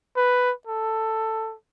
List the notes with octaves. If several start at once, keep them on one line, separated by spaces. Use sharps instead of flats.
B4
A4